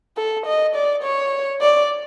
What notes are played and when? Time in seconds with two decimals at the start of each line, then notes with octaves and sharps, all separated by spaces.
0.17 A4
0.46 D#5
0.75 D5
1.03 C#5
1.61 D5